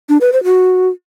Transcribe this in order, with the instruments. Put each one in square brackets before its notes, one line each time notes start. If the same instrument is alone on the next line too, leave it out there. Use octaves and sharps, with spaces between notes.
[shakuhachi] D4
B4
C5
F#4